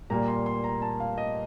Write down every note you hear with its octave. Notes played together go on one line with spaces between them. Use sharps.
A#2 G3 A#3 A#5
C6
C6
A#5
A5
F5
D#5